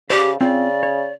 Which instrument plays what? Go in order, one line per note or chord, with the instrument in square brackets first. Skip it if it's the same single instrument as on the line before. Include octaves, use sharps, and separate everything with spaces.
[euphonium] C#3 [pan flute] G4 [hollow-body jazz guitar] C5 D5 F#5
[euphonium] C#3 [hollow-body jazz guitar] C4 F4 [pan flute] D5
[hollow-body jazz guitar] C#5